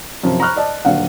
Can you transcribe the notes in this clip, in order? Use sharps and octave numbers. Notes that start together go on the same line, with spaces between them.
F#2 C3 F3
A#5 B5 C#6 F6 F#6
D5 D#5 A5
D#1 D3 F#3 F5 F#5